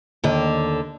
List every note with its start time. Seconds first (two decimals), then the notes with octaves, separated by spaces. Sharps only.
0.24 D#2 D3